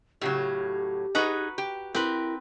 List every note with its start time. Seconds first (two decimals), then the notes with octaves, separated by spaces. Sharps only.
0.21 A2 C#3 F#3 G4
1.15 D#4 F#4 G#4 B4 A#5
1.58 G4
1.95 C4 E4 G4 A#4 B4